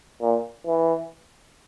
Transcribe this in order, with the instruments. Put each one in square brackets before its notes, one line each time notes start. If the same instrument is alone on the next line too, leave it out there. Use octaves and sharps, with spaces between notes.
[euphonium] A#2
E3